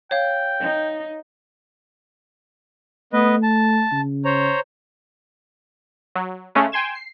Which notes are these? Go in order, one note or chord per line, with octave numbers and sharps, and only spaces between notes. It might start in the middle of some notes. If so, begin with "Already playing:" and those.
C#5 F5 G5
D#4
A3 B3 B4 D#5
A5
C#3
C5 C#5 A#5
F#3
C#3 G#3 A3 C#4
G5 G#5 C6 G#6 E7
C7